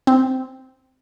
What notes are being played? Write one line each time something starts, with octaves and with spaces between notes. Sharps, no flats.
C4